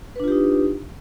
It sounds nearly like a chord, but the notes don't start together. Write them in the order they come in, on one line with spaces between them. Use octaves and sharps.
B4 D4 F4 G4 D#4